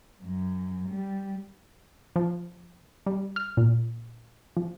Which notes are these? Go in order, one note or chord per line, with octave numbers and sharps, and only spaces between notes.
F#2
G3
F3
G3
F6
A#2
F3